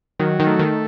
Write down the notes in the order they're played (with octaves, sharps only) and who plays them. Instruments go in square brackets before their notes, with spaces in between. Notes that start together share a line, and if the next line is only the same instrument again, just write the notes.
[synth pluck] D#3 [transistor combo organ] F#3
[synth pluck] D#3
[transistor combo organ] A3
[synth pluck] D#3